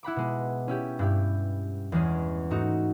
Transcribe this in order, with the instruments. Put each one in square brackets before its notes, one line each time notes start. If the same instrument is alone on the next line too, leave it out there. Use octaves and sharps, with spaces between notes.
[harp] E4 F#5 B5 D6
B2 G#3
C#4 E4 G4
G2 E4 G4
E2 E3 G#3 C#4
G#2 A3 D#4 F#4